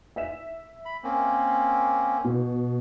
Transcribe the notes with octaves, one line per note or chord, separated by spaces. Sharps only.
E5 B6 E7
B5
A#3 C4 C#4
B2